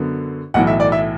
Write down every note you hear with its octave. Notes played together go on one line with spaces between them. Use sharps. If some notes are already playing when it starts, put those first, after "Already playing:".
Already playing: F#2 D3 B3
B1 A2 E3 F#5
E5
D5
E5